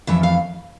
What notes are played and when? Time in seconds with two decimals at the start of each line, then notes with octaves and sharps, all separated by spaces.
0.07 F2 E3 A3 E5
0.23 F5